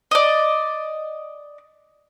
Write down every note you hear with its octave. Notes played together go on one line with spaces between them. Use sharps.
D5 D#5